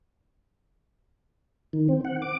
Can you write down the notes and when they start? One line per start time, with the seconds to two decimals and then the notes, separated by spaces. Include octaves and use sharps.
1.73 D#3
1.89 C4
2.05 F#5
2.22 D6